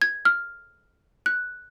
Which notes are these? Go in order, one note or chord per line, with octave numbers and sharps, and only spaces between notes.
G#6
F6
F#6